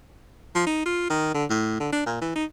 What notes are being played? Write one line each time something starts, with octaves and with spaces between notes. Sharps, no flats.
F3
D#4
F4
D#3
D3
A2
D3
D4
A#2
E3
D#4